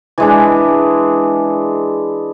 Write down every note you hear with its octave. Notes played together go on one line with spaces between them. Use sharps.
E3 G#3 D4